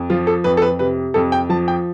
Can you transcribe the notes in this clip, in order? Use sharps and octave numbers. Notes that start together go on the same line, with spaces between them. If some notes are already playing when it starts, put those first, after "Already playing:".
Already playing: F2
F3 F4
A4
F2 B4
A4
B4
C3 B4
F2 A4
G5
F3 A5
G5